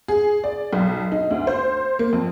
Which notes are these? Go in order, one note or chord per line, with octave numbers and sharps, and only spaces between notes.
G#4
D5
B1
D#4
D2
C5
A#3
F2